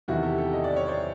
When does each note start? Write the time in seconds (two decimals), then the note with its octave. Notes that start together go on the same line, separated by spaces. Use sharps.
0.08 E2 C3 D#3 E4 F#4
0.22 G4 A4
0.38 G4 A4
0.53 D#5
0.64 D5
0.76 C#5
0.88 C5 D5